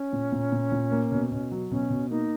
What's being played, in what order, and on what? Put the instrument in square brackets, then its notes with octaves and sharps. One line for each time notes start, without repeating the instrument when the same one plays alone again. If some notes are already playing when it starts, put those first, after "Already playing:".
Already playing: [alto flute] C#4
[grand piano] A#2
A#2
A#2
A#2
A#3
B2
B2
F#3
[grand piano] B2 [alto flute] C#4
[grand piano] B2
[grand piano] A#3 [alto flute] D#4